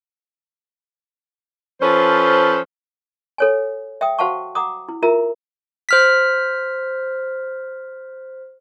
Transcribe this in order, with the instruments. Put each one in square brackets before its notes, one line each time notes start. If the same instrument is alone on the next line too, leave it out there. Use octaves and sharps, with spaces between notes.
[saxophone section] F3 C#4 A4 B4 C5
[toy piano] A4 C#5 G#5
E5 G5 D#6
F#4 C5 F5 F#5 A5 C#6
F#5 A#5 D6 D#6
E4
F4 A#4 E5 A#5
[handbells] C5 F6 B6